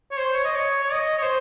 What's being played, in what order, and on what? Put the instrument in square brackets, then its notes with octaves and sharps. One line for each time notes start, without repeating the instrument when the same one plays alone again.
[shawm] C#5
C5
C#5
D#5
C#5
C#5
D#5
C#5
C5